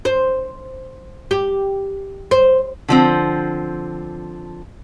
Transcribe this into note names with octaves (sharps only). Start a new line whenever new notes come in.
C5
G4
C5
D3 F3 C4